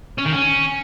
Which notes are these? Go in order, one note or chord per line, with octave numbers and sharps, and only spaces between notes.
C#4
D#3
C#4